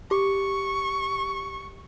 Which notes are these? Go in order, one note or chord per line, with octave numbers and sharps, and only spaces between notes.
G4 C#6